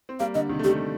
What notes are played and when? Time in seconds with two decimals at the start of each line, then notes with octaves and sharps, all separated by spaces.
0.09 C4
0.20 G3 A#3 F5
0.35 D3 D#5
0.49 C3 D#3
0.59 A3
0.64 D#3 G3 G4